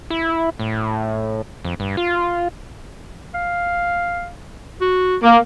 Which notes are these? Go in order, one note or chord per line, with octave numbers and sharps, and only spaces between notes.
E4
A2
F2
G2
F4
F5
F#4
A#3 D6